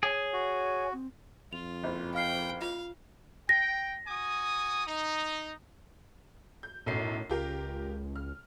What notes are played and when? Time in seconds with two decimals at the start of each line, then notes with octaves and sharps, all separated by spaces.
0.03 G#4 C#5
0.33 F#4
0.93 C4
1.53 F2 F4 F7
1.83 F#1
2.15 F5 G5 F6 C7
2.62 F4 F5
3.49 G5 A#6
4.08 F#4 G#5 D#6
4.87 D#4
6.63 G6
6.86 B1 F#2 A2 C7
7.30 C#2 F4 G4 A#4
8.16 F6